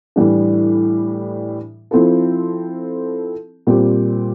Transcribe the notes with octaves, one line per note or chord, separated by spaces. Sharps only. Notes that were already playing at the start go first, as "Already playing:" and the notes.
A2 E3 G3 D4
F3 C4 E4 A4
A#2 G3 C4 G4